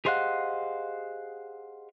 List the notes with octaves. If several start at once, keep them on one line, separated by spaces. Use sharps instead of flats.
G4 G#4 C5 D#5 F5 F#5